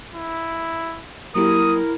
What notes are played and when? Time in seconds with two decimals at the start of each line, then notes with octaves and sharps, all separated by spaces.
0.15 E4
1.35 F#3 A#3 E4 G4 A#4 D#6